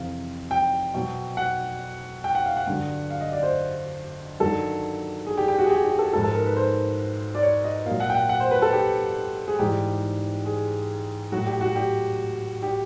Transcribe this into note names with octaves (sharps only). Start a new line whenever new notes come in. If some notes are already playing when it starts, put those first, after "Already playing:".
Already playing: F2 C3 E3 F5
G5
B2 F#3
F#5
G5
F#5
F5
F#5
G2 D3 F#3
F5
D#5
D5
C5
G2 D#3 F#3 A4
G#4
G4
G4
F#4
G#4
G4
G4
A4
G#2 F3 A4
A4
A#4
B4
C5
D5
C#5
D#5
A#2 F#3 F5
F#5
G5
F#5
F#5
C5
B4
A4
G4
G#4
G#2 E3 G3 G4
G#4
A2 F#3 F#4
G4
F#4
G4
G4